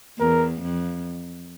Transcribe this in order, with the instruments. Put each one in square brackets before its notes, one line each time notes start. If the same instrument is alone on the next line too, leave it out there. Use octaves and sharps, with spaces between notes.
[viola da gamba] E2 [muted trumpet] A#4
[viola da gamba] F2